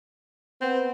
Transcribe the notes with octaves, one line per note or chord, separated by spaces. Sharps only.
B3 C4